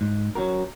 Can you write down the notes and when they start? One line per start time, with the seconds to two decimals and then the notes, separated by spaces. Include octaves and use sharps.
0.01 G#2
0.35 F#3 C#4 F#4 A#4